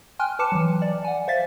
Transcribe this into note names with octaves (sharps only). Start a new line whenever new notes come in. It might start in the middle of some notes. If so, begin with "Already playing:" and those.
G5 G#5 C6 F6 F#6
B4 A5 D6 C#7 E7
E3 F#3
D5
F#5 G#5
C5 E5 F5 A6 B6